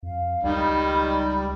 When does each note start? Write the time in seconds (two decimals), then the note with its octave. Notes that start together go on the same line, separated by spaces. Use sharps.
0.03 F2 F5
0.43 C#2 D#3 G3 B5